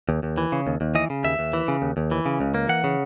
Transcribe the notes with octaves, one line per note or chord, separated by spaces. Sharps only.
D#2
D#2
E3
C#3
D#2
D#2
E3 D#5
C#3
D#2 E5
D#2
E3
C#3
D#2
D#2
E3
C#3
C#2
A#3
E3 F#5
C#3